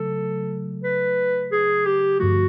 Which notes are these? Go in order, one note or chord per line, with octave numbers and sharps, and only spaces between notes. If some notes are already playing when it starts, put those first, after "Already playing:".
Already playing: C#3 F#3 A3 A4
B4
G#4
G4
G2 D3 F3 A3 F#4